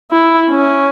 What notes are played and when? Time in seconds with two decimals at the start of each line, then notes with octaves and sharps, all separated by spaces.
0.11 E4
0.50 C#4